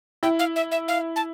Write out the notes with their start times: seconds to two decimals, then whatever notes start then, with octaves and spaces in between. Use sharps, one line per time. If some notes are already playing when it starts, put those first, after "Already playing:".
0.23 E4 G5
0.39 F5
0.56 E5
0.71 E5
0.88 F5
1.16 A5